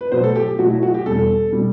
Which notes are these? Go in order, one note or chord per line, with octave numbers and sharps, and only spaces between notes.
B4
B2 F#3 A3 C5
A4
G4
G4
B2 F#3 A3 F#4
E4
F#4
G4
E2 B2 G3 A4
B2 G3